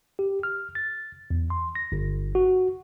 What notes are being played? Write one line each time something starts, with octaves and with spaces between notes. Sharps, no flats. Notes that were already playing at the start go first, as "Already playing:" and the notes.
G4
F6
A6
E2
C6
A#6
G1
F#4